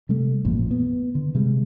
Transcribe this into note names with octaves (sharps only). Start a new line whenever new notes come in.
C3 G3 A3
A1 F2 A#2
B3
D3
C3 G3 G#3